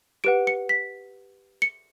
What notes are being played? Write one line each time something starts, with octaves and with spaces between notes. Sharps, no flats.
G4 B4 F#5 D7
C#7
B6
C#7